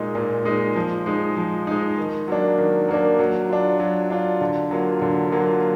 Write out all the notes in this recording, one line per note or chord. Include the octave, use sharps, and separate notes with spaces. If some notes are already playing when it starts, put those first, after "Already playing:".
Already playing: A#2 G#3 D#4
A#2
G#3 D#4
F3
G#3 D#4
F3
G#3 D#4
D#3
F#3 A#3 D4
D#3
F#3 A#3 D4
F#3
D4 F4
F#3
D4 F4
D3
F#3 A#3 F4
D3
F#3 A#3 F4